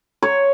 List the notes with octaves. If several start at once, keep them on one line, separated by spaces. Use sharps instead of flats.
C#5